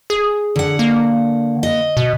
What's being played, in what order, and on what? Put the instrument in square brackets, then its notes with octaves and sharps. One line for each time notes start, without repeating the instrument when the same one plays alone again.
[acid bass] G#4
[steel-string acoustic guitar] D3 F#5
[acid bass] A#3
[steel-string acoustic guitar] D#5
[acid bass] B2